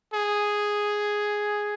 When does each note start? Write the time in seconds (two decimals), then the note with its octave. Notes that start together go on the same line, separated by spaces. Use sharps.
0.14 G#4